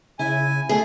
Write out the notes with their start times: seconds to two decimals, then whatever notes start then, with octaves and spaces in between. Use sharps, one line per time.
0.19 C#3 E4 G#5
0.69 A3 F4 G#4